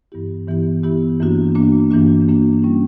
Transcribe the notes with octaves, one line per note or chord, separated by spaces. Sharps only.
G2 E3 B3 E4 G4
G2 E3 B3 E4 G4
G2 E3 B3 E4 G4
G2 E3 A#3 D4 F#4
G2 E3 A#3 D4 F#4
G2 E3 A#3 D4 F#4
G2 E3 A#3 D4 F#4
E3 G3 C#4 E4